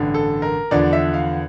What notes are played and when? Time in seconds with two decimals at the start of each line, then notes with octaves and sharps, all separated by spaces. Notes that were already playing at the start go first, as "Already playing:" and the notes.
Already playing: A1 G2 D3
0.14 A4
0.42 A#4
0.71 E2 D3 F3 D5
0.93 E5
1.14 F5